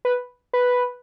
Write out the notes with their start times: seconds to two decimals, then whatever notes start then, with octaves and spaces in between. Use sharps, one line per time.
0.05 B4
0.54 B4